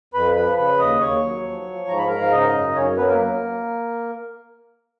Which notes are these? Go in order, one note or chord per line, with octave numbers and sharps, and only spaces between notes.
F2 B4 B5
F3 B4 B5
C#3 B4 B5
D#2 D#5 D#6
D#2 C#5 C#6
F#3
F3
F3
G#2 A#5
B5
G#2 A#4 A#5
F5
C#3 D#4 D#5
F#2
F#2 C#4 C#5
F#3 B3 B4
A#3 A#4
F#3